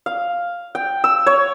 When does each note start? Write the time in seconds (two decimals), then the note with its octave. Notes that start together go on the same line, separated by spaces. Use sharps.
0.06 F5
0.75 G5
1.04 E6
1.26 C#5